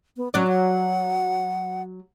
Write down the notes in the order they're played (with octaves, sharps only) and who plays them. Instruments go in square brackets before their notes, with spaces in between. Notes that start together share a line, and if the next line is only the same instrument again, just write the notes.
[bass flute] B3
[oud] F#3 F#4 D5 [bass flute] C#4
[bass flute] F#5